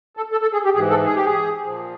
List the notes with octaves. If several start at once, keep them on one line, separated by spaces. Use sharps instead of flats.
A4
A4
A4
G#4
G4
G#2 E3 G#4
A4
G#4
G4
G#4
A#2 F3